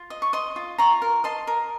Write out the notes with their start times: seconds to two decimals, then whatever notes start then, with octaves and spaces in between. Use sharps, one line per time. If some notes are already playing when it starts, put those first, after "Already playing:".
Already playing: F4
0.10 D#5
0.22 C#6
0.33 D#5 C6 D#6
0.56 F4
0.78 F4 A#5 C#6
1.02 A#4
1.24 D#5 A5 C6
1.47 A#4